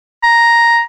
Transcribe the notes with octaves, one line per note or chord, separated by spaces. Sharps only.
A#5